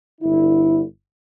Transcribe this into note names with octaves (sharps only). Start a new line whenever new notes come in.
G1 D3 E4